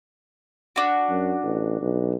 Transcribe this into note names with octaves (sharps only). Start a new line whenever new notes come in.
D4 F#4
F#2
A1
B1